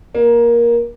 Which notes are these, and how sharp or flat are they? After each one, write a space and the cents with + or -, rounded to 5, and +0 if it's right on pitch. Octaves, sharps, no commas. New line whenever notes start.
A#3 +15